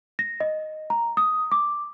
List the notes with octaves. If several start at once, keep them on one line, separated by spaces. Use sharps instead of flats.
A#6
D#5
A#5
D#6
D6